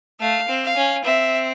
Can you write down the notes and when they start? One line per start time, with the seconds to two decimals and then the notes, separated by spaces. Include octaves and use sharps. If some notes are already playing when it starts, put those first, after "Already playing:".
0.20 A3 F5
0.48 C4
0.63 F5
0.76 C#4
1.05 C4 E5